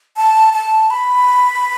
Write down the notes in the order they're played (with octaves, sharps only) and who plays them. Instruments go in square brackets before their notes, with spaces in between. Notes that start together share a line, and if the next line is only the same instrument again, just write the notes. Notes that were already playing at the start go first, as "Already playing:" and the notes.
[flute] A5
A5
B5